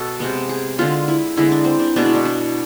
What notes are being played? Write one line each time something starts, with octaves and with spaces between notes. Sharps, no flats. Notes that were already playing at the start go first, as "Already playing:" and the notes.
Already playing: B2 A4
C3 G#3 B3
G#4
D3 G#3 B3 F4
E4
D3 G#3 B3 E4
D4
C4
D4
B2 G#3 B3 D4
E4
D4
D4